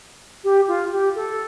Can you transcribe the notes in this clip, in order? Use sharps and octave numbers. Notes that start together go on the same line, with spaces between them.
G4
F4
G4
A4